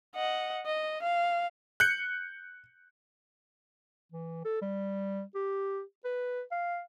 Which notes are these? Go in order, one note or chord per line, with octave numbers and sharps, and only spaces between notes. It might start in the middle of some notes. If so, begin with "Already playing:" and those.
D#5 F#5
D#5
F5
F#6 G6 C#7
E3
A4
G3
G4
B4
F5